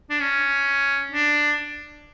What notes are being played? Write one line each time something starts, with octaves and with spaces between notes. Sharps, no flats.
D4
C#4
D4